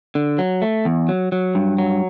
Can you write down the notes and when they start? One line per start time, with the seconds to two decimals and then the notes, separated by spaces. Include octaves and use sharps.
0.15 D3
0.38 F#3
0.62 A3
0.85 E2
1.08 F#3
1.32 F#3
1.55 G2
1.78 F#3